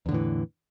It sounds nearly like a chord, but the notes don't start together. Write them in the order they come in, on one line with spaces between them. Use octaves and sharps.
E2 D3 A2 E3